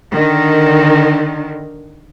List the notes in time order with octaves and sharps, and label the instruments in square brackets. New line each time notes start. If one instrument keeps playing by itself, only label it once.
[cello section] D3 D#3